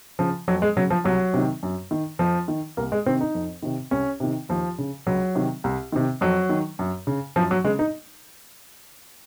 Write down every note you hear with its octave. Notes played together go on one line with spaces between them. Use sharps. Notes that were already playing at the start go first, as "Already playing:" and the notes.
C#3 F3
F2 F#3
G#3
C#3 F#3
F3
C2 F#3
C3 D#3
F#2
D#3
F2 F3
D#3
C2 A#3
G#3
C3 D#3 C4
D#4
F2
C3 D#3
C2 C#4
C3 D#3
D#2 F3
C#3
C#2 F#3
C3 D#3
C2
C3 D#3
F2 F#3
D#3
F#2
C#3
F#2 F3
F#3
C#3 G#3
D#4